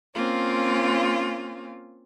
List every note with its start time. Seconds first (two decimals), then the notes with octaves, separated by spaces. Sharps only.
0.15 A#3 C4 C#4 F4